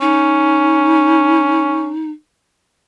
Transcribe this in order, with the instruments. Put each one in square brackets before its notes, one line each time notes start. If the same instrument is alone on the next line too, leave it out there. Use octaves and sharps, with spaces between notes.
[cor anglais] C#4 [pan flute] D#4